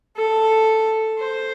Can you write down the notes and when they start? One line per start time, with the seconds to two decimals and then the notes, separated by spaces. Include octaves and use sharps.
0.16 A4
1.18 C5